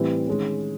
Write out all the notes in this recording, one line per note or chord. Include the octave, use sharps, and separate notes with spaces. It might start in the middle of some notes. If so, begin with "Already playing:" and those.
Already playing: A2 E3 G3 C4
D#3 G#3 C#4